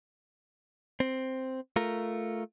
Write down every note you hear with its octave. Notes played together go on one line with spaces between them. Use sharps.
C4
A3 F4 A#4